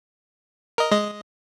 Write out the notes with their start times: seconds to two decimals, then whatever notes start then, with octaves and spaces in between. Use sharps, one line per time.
0.78 A#4 D#5
0.91 G#3 D#5